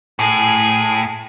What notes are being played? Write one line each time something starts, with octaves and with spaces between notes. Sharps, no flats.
A2 G#4